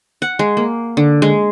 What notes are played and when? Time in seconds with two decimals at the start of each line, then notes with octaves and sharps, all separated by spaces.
0.22 F#5
0.39 G#3
0.57 A#3
0.97 D3
1.22 G#3